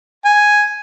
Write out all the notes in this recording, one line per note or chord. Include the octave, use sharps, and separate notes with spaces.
G#5